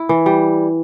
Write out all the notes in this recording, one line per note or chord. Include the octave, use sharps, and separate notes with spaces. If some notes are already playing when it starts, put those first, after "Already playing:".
Already playing: E4
E3
G3